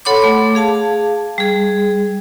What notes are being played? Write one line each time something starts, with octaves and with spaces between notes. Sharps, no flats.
A4 C#5 F#5 B5 C6 D6
A3 D6
G#4 F5 A5
G3 G#4